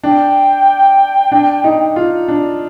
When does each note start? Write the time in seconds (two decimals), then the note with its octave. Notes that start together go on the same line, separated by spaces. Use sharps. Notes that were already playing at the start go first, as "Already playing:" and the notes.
0.03 D4 G5
1.32 D4
1.64 D#4
1.96 F4
2.28 D4